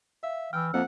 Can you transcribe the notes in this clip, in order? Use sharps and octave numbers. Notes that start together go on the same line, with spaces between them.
E5 F5
E3 G5 E6 F6
F2 A#3 F#5